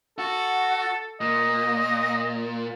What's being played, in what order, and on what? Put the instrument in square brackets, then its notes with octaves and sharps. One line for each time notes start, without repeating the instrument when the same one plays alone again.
[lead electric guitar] F#4 [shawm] A4
[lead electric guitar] A#2 [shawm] D#5